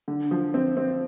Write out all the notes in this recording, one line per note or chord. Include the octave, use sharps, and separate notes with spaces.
D3
F3
C4
C4